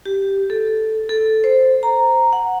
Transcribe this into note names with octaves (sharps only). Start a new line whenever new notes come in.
G4
A4
A4
C5
A#5
F#5